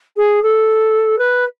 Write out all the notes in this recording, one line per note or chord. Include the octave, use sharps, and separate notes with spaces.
G#4
A4
B4